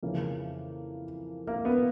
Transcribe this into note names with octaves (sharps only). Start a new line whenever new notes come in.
F2 C#3 E3 A#3
A#3
B3